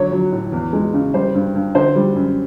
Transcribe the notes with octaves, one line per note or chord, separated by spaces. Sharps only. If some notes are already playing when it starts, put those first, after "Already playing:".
Already playing: D3 F#3 C#5
F#3
A2
E2
G#3
C#3
G3 C5
G2
G2
D3 C5
G3
F#2